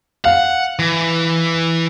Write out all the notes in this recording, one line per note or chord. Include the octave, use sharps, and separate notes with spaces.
F5 F#5
E3